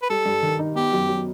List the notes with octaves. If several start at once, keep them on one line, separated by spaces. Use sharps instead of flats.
B4
G3 A4
G2
D#3
D#4
B3 G4
F#2
F#3